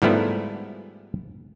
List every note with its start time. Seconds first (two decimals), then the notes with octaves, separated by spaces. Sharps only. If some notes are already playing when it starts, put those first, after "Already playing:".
0.02 G#2 F3 G3 A3 B3 E4